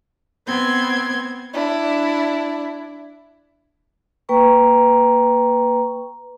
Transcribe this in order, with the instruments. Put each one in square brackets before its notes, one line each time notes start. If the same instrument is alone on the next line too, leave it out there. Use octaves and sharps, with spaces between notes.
[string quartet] B3 C4 C6 G#6
D4 E4
[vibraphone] A#3 B4 G5 A#5 C#6